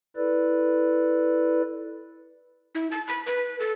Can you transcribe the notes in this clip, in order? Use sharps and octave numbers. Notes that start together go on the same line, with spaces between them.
E4 A4 B4 D5
E4
A5
B5
B4
A4